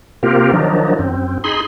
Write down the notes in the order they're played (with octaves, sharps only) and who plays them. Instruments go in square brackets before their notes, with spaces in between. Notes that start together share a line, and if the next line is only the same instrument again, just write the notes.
[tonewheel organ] C3 A#3 C4 F4 G4 A#4
D#3 F3 F#3 D4 D#4
F#2 C4
D#4 G#4 B5 C6